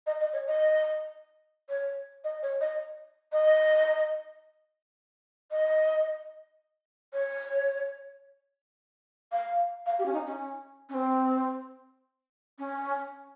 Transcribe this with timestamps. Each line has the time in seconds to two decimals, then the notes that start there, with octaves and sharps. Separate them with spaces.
0.07 D#5
0.20 D#5
0.33 C#5
0.48 D#5
1.69 C#5
2.24 D#5
2.43 C#5
2.61 D#5
3.33 D#5
5.51 D#5
7.13 C#5
9.32 F5
9.86 F5
9.99 G4
10.06 C#4
10.14 D#4
10.27 C#4
10.89 C#4
10.94 C4
12.59 C#4